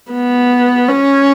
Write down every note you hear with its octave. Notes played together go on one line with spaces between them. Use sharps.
B3
C#4